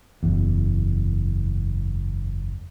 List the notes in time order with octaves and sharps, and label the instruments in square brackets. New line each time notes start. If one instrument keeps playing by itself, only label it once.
[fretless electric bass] F#1 E2